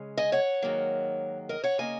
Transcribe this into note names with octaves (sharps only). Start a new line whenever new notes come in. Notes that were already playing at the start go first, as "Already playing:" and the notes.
Already playing: C#3 G#3 C#4
D#5 G#5
C#5 F#5
G#2 D#3 F#3 A#3
A#4 D#5
C#5 F#5
C#3 A#3 C#4 D#5 G#5